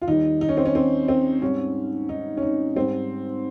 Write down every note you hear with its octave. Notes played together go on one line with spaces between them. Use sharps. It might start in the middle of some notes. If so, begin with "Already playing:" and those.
F4
D#2 D#3 G3 D#4
D#4
C#4
C4
C#4
C4
C4
G#2 G3 C#4
D#4
C#4
D#4
G#2 G3 C4